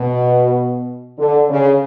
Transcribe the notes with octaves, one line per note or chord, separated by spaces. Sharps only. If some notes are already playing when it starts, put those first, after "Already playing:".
Already playing: B2
D3
C#3